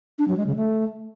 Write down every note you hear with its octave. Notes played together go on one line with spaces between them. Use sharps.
D4
F#3
G#3
C#3
A3